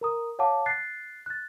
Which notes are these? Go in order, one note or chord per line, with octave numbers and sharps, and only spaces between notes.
A#4 A#5 D#6
C#5 F5 F#5 A5 D6
F#6 A6 C7
F#6 A6